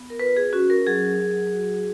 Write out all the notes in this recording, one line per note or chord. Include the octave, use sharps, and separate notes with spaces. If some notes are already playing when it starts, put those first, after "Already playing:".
Already playing: B3
A#4
F4 B4
G#4
C#4 F#4
A#4
F#3 G#4
F#3
F#4